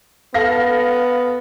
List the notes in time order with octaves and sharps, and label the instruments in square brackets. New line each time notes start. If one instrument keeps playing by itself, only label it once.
[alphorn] B3 [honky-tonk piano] A4 F5 A#6